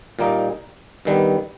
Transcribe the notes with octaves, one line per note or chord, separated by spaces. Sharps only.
A#2 G3 A#3 D#4
G2 D#3 G3 B3